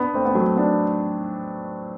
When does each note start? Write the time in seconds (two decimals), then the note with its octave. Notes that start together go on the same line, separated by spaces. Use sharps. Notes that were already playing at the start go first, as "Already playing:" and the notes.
Already playing: B3 D4
0.14 A3 C4
0.25 B3
0.35 F#3 A3
0.57 B3 D4